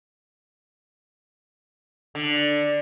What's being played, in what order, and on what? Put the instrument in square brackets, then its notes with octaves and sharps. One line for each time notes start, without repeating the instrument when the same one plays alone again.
[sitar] D3